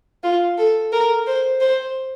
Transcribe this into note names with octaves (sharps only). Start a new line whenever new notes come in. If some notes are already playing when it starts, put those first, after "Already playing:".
F4
A4
A#4
C5
C5